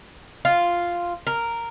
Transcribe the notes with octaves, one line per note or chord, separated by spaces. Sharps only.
F4
A#4